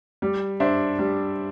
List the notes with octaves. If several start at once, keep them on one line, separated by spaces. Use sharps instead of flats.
G3
D4 C5 E5
G3